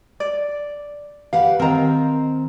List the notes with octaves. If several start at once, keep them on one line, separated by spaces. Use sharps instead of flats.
D5
G4 B4 F5 F#5
D#3 C4 A#4 A#5